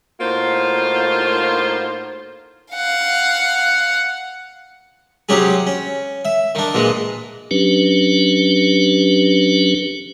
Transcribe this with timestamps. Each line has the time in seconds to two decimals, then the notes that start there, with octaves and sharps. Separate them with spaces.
0.20 A2 A#3 D#4 F4 F#4 C5
2.74 F5 F#5
5.29 C3 F#3 C#4 G4 G#4
5.67 C#4
6.25 E5
6.55 D#3 D4
6.74 A#2 E3 G#3
7.51 F#3 C#4 D4 G4 B4